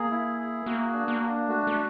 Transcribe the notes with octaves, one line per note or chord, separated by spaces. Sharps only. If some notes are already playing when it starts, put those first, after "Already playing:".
Already playing: A#3 G#4
E4
G#4
A#3 F#4
D4
A#3
D4
A3 F#4
A3